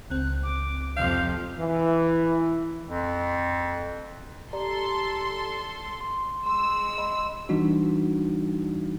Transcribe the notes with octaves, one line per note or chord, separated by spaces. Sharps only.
C#2 C4 F#6
D6
F2 C3 F3 F5 G6
E3
F2
G4 A4 D5 A#5 C6
C6
G#3 C6 E6
D#5 B5 C6
E3 G3 D4 D#4 F#4